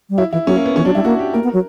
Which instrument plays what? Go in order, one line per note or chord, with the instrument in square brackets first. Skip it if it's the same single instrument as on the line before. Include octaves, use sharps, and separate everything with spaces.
[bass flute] G3
[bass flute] F#3 [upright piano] E4
[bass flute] E3 [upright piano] E4
[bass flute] F#3 [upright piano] C#4
[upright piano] A#3
B3
[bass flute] E3 [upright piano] C#4
[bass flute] F#3 [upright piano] D4
[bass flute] G3 [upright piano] E4
[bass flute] A#3 [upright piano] F#4
[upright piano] G4
[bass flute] A#3 [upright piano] A#4
[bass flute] B3
F#3